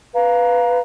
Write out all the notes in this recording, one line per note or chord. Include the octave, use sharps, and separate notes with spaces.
B4 F5 A#5